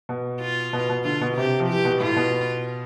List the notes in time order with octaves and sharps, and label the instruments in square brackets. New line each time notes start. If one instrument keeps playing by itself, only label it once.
[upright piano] B2
[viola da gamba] F4
[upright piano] B2
B2
[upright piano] D3 [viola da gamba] F4
[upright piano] B2
[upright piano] C3 [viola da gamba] G4
[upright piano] F3
[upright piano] E3 [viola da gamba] G4
[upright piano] B2
[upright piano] A2 [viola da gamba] F4
[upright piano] B2